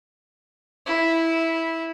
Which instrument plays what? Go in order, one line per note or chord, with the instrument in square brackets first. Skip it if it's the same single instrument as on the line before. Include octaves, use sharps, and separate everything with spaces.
[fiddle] E4